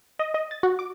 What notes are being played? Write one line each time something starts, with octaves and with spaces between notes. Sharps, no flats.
D#5
D#5
A6
F#4
D6